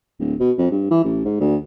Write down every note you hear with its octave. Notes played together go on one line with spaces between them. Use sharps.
D1
B2
F2
G2
E3
A1
G#2
D2